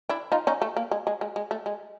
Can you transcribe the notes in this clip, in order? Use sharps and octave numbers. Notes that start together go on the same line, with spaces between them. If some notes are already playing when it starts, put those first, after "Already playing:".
D4 E4
D#4 F4
C#4 D#4
A3
A#3
G#3
G#3
G#3
G#3
A3
G#3